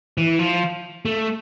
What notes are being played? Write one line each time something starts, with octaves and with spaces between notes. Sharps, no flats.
E3
F3
A3